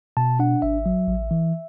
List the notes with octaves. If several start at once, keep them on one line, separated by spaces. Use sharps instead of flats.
B2 A5
D4 F#5
G#1 E5
F#3
A1
E3